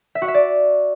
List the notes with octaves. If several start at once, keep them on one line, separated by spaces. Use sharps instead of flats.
E5
F#4
E5
D5